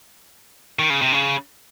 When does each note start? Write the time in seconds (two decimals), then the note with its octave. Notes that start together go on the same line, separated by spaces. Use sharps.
0.79 D#3
0.90 C#3
1.02 C3
1.12 C#3